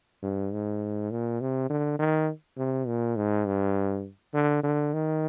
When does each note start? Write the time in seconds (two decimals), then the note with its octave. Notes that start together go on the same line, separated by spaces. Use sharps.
0.23 G2
0.53 G#2
1.11 A#2
1.41 C3
1.70 D3
1.99 D#3
2.57 C3
2.87 A#2
3.16 G#2
3.46 G2
4.34 D3
4.63 D3
4.93 D#3